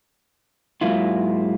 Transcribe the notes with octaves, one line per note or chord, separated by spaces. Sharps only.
G#2 F#3 A#3 E4 F4